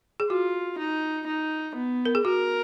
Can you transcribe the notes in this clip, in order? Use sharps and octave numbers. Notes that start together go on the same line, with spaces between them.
G#4
F4 F#4
D#4
D#4
B3
A#4
G#4
F#4 A#4